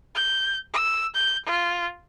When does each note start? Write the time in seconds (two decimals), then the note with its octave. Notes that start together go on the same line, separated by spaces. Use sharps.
0.15 G6
0.74 E6
1.15 G6
1.45 F4